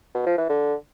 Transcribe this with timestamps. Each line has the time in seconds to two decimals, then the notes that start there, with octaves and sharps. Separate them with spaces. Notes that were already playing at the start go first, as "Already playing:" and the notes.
0.15 B2
0.26 F3
0.38 E3
0.49 D3